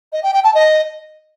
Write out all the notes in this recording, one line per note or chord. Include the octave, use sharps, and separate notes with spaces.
D#5
G5
G5
A5
D#5